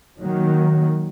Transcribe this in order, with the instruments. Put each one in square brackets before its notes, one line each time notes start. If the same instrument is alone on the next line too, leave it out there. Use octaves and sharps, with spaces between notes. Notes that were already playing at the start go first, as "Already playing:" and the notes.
[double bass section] D#3 F#3 A#3